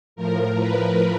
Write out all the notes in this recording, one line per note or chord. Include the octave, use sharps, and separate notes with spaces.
A2 F3 A#4
B4